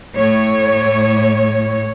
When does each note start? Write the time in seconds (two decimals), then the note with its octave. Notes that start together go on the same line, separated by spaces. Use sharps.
0.16 A2 C#5